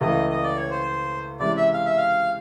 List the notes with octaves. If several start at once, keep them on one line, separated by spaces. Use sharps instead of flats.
C#2 C#3 E3 A3 D#5
D#5
D5
C#5
C5
C3 E3 G#3 C#4 D5
E5
F5
E5
F5